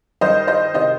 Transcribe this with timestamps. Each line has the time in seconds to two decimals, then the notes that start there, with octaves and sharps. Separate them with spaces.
0.21 G2 D#3 G3 C5 D#5
0.47 C5 D#5
0.74 C3 D#3 C5 D#5